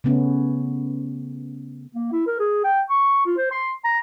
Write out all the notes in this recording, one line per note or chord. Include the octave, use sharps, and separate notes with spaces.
C#3 A3 B3 C#4
A#3
E4
A#4
G#4
G5
C#6
F4
C5
C6
A#5